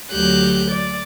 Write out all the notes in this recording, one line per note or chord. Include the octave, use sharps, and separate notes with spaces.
D2 F#3 G4 F#6 G6
D5